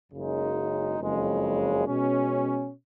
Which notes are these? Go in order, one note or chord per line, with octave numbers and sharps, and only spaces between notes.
F#1 F#2 C#3 G#3 D#4
F#1 F2 C#3 G#3
B2 G#3 C#4